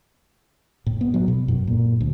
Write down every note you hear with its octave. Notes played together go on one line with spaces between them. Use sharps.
A2
B3
F#3
B2
F#2
A#2
D2